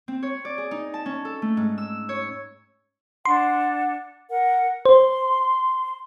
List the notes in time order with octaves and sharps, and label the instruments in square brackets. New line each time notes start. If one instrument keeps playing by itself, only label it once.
[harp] C4
C#5
D5
G#4
D#4
A5
C#4
A4
A3
G#2
E6
C#5
[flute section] D4 F#5 [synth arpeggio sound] C6
[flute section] A#4 F#5
[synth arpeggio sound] C5 [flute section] C6